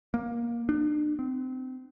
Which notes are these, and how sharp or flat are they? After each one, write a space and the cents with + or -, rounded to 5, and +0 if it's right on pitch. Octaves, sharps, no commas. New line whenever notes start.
A#3 +15
D4 +40
C4 -25